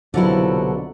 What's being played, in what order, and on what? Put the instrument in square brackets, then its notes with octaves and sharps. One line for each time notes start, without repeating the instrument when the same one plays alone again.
[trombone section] C2 B2 F3 [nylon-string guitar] D3 F#3 E4